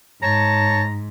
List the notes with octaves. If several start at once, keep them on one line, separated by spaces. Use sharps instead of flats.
G#2 C#5 A5 A#5